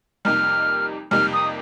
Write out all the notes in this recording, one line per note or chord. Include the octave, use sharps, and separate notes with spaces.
F2 C3 G3 A#3 D#4 F6
F2 C3 G3 A#3 D#4 F6
D#6